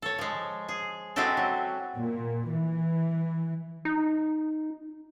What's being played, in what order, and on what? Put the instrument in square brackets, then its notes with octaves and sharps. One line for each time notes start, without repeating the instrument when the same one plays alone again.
[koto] A4 C#5
F3 G#3
G#4
G#3 C4 E4 F#4 G4 A4
F#3
[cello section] A#2
E3
[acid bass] D#4